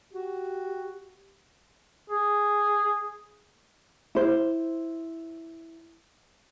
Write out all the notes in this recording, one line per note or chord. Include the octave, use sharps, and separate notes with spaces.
F#4 G4
G#4
E4 C5